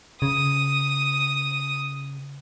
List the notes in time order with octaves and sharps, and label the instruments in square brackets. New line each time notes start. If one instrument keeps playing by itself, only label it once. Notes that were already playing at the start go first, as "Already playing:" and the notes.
[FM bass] C#3 [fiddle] D#6